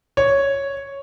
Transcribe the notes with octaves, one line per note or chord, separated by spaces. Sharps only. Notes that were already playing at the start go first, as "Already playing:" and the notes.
C#5